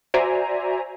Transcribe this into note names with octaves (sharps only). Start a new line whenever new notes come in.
F#4 C5 D5 E5 G#5 A#5